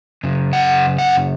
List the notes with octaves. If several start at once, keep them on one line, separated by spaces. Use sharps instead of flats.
F#2 C#3
F#5
F#5